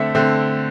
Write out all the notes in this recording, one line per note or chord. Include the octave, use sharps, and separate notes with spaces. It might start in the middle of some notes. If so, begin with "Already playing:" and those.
Already playing: D3 A3 C4 E5
D3 A3 C4